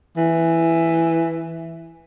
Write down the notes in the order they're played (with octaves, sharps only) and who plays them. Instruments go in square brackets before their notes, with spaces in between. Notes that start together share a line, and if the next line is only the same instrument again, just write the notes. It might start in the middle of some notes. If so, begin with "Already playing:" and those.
[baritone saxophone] E3